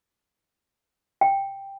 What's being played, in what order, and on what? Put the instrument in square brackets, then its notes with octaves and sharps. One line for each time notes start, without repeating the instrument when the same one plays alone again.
[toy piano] G5